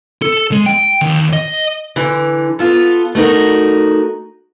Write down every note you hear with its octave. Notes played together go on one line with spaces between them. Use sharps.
A4
G#3
G5
D#2
D#5
D3 E3
B3 F4 A4
A3 B3 D#4 F#4 A#4